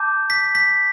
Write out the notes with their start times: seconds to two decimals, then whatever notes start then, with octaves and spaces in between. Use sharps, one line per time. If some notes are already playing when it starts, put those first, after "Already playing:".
Already playing: A5 D6 G6
0.30 B6
0.55 B6